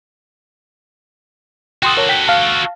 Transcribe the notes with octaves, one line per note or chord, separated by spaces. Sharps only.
F#4 A4 G5 C6 D#6
A#4 C#5 A5
G5 B6
F5 A5